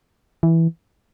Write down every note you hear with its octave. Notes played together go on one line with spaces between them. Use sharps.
E3